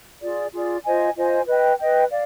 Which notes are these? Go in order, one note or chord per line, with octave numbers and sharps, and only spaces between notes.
F4 G#4 D5
F4 G#4 D5
F4 C5 D#5 G#5
F4 C5 D#5 G#5
B4 D#5 G5
B4 D#5 G5
D5 F5